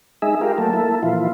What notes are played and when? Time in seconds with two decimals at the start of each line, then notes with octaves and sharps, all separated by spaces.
0.22 G#3 D#4 G#4 E5
0.41 F4 G4 A#4
0.58 F#3 A3 A#3 A4
0.73 A#3 E4 A4
1.03 A#2 E3 F3 E4 F4